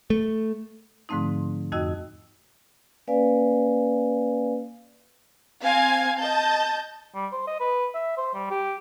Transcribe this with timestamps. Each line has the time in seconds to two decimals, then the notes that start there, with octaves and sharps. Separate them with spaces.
0.10 A3
1.09 G#2 D3 F3 A3 C4 D#4
1.72 F2 D#4 F#4 D#5 G5 E6
3.07 A#3 C#4 B4 D5 F5 G#5
5.63 C4 F5 G#5 G#6
6.18 D#5 A5 G6
7.15 G3
7.32 C5
7.47 D#5
7.60 B4
7.94 E5
8.17 C5
8.34 G3
8.50 G4